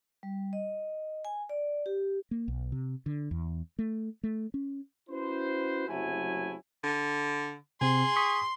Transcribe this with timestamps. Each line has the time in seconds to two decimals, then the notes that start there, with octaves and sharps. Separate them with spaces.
0.23 G3
0.53 D#5
1.25 G#5
1.49 D5
1.86 G4
2.31 A#3
2.48 B1
2.72 C3
3.06 D3
3.31 E2
3.79 A3
4.24 A3
4.54 C#4
5.10 C#4 E4 F#4 B4 C5
5.88 F#1 C3 F#3 A3 E4 G#5
6.84 D3
7.81 C3 C4 G#4 C6
8.16 C#6 D#6 B6